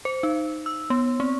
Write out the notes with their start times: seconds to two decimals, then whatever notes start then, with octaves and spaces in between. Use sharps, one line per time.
0.05 C5
0.23 D#4
0.66 E6
0.90 B3
1.20 C4